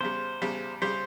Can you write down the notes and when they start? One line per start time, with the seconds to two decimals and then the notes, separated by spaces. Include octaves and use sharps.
0.01 E2 C#3 G3 C5
0.42 E2 C#3 G3
0.82 C#3 G3 C5